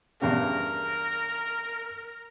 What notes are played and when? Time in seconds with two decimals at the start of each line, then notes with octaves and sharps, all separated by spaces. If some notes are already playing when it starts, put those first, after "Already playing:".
0.21 E2 G2 C#3 A#4